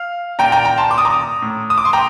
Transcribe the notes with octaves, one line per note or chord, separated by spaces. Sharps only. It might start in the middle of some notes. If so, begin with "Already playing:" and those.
Already playing: F5
A#2 G5 A#5
G5 A#5
G5 A#5
A5 C6
D6
D#6
A#5 D6
A2
D#6
D6
C6
G5 A#5